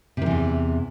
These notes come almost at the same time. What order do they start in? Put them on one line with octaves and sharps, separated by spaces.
C3 D#3 E3 E2